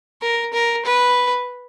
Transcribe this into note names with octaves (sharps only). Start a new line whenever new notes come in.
A#4
A#4
B4